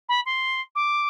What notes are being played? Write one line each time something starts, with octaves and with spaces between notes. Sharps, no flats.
B5
C6
D6